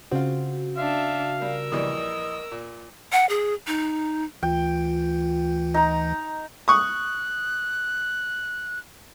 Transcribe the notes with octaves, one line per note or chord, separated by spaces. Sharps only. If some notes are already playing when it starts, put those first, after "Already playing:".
C#3 C4 F4 F#4
D4 E5 F5
G3 A#4 E6
A#1 E3 G3 D#5
A#2
F#5
G#4
D#4
D2 E3 F4 G5
D#4 A#5
C#6 D#6 F#6